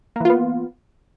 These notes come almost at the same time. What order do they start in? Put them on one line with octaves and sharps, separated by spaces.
A#3 E3 F4 B3